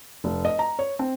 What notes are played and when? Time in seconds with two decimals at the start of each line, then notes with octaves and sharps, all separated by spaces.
0.24 F1
0.45 D#5
0.59 A#5
0.79 C#5
0.99 C4